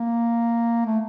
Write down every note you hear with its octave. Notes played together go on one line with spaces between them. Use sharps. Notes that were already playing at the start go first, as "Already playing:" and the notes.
Already playing: A#3
A3